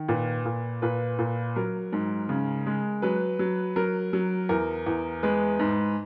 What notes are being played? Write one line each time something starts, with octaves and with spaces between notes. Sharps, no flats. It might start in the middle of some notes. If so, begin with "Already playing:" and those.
Already playing: D#3
A#2 B4
A#2
A#2 B4
A#2
F#3 A#4
G#2
C#3
G#3
F#3 B4
F#3
F#3 A#4
F#3
E2 A#4
E2
G#3 B4
G#2